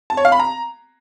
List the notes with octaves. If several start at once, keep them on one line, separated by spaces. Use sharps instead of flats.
A5
C#5
F5
B5
A#5